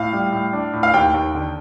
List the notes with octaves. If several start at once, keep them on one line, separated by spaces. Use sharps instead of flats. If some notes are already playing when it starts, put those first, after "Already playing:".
Already playing: A2 F5
G3
A2
D4
A2
F5
D#2 G5
D#2
D3